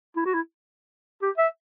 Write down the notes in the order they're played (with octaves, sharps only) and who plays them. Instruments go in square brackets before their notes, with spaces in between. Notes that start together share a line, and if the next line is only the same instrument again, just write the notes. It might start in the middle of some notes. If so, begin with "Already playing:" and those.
[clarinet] E4
F#4
E4
G4
E5